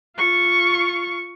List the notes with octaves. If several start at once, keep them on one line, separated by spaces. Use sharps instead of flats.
F4 C#6